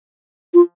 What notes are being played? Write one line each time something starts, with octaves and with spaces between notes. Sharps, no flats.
F4